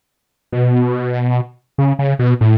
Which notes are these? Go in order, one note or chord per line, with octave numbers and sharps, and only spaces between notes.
B2
C#3
C#3
B2
A2